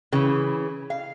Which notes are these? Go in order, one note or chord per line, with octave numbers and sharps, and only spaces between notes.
C#3 E3
F5